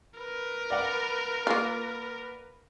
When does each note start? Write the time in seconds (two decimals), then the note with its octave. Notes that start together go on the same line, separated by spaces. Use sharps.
0.20 A#4 B4
0.70 D5 F5 F#5
1.47 A#3 F4